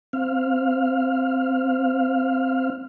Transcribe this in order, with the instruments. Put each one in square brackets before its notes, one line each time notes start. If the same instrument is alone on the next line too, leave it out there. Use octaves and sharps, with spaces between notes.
[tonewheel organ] C4 F5